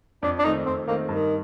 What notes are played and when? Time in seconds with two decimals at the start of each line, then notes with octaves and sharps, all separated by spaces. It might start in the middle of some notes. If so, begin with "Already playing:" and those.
0.23 F2 D4
0.39 D4
0.45 D#3 A3 C4 D#4
0.66 F2 C4
0.87 D#3 A3 A#3 C4
1.09 G2 D#3